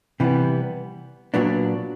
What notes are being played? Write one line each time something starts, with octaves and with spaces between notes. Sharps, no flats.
C3 E3 G3 B3
A#2 F#3 B3 D4